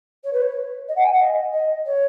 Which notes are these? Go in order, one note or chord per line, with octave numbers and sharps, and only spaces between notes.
C#5
B4
C#5
D#5
F#5
G#5
F#5
D#5
D#5
C#5